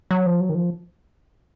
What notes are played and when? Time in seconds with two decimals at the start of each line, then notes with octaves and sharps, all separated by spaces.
0.11 F#3
0.26 F3
0.40 F#3
0.49 D#3
0.55 F3